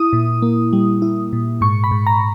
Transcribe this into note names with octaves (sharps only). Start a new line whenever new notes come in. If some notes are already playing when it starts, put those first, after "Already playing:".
Already playing: E4 D#6
A#2
A#3
G3
E4
A#2
G#2 C#6
B5
G#2
A#5